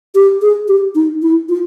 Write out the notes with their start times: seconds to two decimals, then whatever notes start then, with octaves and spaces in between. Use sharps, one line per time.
0.15 G4
0.42 G#4
0.68 G4
0.95 D#4
1.22 E4
1.49 F4